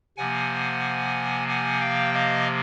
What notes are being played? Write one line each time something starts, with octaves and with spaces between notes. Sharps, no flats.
C3 F3 A#3 F#5 G#5
F#5 G#5
F5 G5
D#5 F5